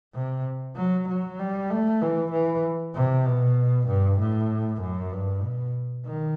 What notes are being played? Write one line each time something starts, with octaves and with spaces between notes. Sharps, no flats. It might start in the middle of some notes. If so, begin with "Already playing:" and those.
C3
F#3
F#3
G3
A3
E3
E3
C3
B2
G2
A2
F#2
G2
B2
D#3